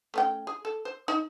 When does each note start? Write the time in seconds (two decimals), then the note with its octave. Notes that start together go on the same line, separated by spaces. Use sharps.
0.14 A3 C#4 G5
0.47 G#4
0.65 A4
0.85 C5
1.08 D#4